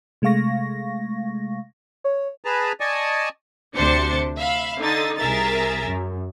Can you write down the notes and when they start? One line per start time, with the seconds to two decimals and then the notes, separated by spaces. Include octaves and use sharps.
0.22 C3 G#3 A3 F5 C#6 A#6
2.04 C#5
2.44 G#4 B4 A5 A#5
2.80 D5 D#5 G#5 A5 C#6 D#6
3.75 D2 C3 D4 C5 A6 C#7
4.37 E5 F5 B5
4.79 D3 D#4 D#6 A6
5.18 C2 G#4 A#4 E5 A#5 A6
5.87 F#2